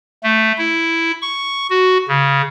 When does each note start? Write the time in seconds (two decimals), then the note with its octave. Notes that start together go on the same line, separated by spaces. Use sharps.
0.23 A3
0.58 E4
1.22 C#6
1.70 F#4
2.08 C#3